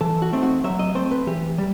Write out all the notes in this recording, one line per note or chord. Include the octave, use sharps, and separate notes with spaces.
E3 A4
F#4
A3 C4 D#4
F#4
F#3 E5
D#5
A3 C4 C5
B4
E3 G4
G3